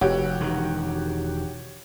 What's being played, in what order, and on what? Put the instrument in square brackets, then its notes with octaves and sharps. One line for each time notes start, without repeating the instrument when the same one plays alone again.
[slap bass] F1 [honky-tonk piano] F#4 G4 [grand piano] C#5
[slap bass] E1 D#3